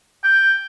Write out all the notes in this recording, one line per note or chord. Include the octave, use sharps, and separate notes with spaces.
G5